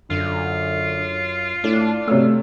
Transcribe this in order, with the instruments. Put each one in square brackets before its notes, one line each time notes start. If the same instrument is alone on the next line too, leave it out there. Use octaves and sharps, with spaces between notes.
[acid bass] F#2 [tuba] D3 [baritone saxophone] F4
[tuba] A2 [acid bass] D4
[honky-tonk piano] C3 C#4 E6 [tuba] A3